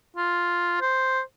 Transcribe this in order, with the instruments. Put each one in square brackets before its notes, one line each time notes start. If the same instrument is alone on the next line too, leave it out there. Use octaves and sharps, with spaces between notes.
[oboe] F4
C5